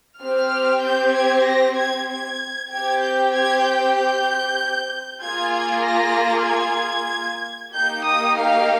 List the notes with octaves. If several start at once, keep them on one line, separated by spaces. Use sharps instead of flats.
C4 G4 F6
G6
G#6
A#6
G#6
G#6
C4 G4 G#6
G6
G#6
G6
G6
A#3 F4 G#4 G#6
G#6
A#6
G#6
A#3 D#4 G4 G6
D#6
F5